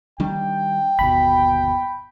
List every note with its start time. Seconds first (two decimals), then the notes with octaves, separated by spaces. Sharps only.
0.20 D#3 G3 D4 G5
0.99 G1 D#2 B2 B5